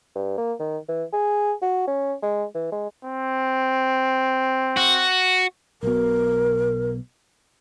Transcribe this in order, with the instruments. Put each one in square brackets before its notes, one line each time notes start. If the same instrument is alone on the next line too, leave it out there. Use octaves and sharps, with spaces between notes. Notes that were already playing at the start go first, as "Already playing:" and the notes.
[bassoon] G2
A#3
D#3
E3
G#4
F#4
C#4
G#3
E3
G#3
[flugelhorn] C4
[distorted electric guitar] F#4
[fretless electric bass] B1 B2 [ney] A#4